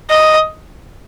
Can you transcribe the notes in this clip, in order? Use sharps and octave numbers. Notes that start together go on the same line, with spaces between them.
D#5